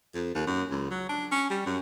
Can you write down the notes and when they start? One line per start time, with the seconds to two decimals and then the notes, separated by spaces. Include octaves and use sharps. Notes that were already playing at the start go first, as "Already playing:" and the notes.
0.14 F2
0.35 D#2
0.47 F#2
0.71 C#2
0.91 F#3
1.09 D4
1.32 C#4
1.50 G3
1.66 F#2